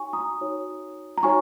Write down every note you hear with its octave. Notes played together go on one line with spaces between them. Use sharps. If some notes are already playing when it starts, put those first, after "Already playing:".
Already playing: D#4 F#4 C#5 G#5 C#6
A#5 D#6
D#4 F#4 C#5
A#5
D#4 F#4 C#5 G#5 C#6